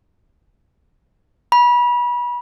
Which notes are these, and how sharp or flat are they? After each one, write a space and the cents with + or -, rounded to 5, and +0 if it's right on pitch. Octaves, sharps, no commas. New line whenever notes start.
B5 -30